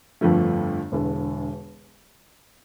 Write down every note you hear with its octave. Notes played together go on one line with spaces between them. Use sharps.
G1 F2 D3 F3 A3
E1 E2 D3